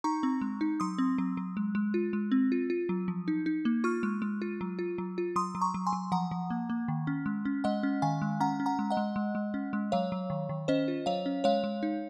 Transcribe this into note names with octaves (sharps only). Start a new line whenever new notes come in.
D#4 A#5 C#6
C4
G#3
D#4
F#3 C6 D#6
C4
F#3
F#3
G#3
G#3
F4
G#3
C4
F4
F4
F#3
F3
D#4
D#4
A#3
F4 C#6 F6
G#3
G#3
F4
F#3
F4
F#3
F4
F#3 C6 D#6
F#3
A#5 C#6
F#3
G#5 C6
F#3
F3 F#5 A#5
F3
A#3
A#3
D#3
C#4
G#3
C#4
G#3 D#5 F#5
C#4
D#3 F5 G#5
G#3
C#4 F#5 A#5
C#4
F#5 A#5
G#3
D#5 F#5
G#3
G#3
G#3
C#4
G#3
F#3 C#5 F5
F#3
D#3
D#3
C#4 C5 D#5
F4
F#3 C#5 F5
C#4
G#3 C#5 F5
G#3
D#4